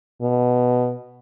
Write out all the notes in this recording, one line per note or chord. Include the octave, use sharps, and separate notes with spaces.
B2